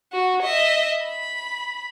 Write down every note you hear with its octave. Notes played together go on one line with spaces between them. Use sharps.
F#4
D#5 E5
B5